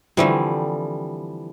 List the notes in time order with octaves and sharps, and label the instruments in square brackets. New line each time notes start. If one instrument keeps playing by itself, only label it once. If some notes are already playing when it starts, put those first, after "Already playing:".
[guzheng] D3 A3 C4 [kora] E3 F3 G3